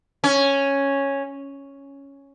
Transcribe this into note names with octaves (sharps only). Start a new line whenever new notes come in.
C#4